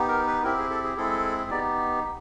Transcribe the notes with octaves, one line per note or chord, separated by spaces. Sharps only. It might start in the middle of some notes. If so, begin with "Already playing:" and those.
Already playing: B3 D#4 G4
A#4
B4
C4 E4 G4 A#4
G#4
A4
G#4
G#3 C4 E4 G#4 A4
B3 D#4 G4 D5